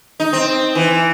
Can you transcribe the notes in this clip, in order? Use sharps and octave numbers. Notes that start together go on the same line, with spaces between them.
D#4
C4
E3